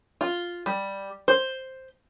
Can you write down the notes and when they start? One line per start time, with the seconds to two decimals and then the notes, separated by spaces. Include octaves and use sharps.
0.21 F4
0.66 G3
1.28 C5